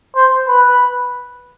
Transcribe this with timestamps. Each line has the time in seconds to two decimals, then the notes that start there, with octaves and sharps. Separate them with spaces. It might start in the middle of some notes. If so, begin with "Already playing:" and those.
0.16 C5
0.48 B4